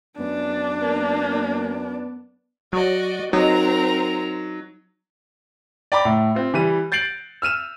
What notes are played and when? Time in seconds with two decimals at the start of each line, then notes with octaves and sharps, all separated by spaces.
0.19 F#2 B3 D4
0.80 A#3 B3
2.73 F#3 F#4 D5 D#5
3.33 F#3 C4 D#4 A#4 A#5
5.92 D5 G5 A#5 B5 D6
6.05 A2
6.35 C4 F4
6.54 E3 G3 D#7
6.92 G6 A6 C7 D7 F#7
7.42 E6 F6 D#7 E7